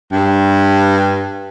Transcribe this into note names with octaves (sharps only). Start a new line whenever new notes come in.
G2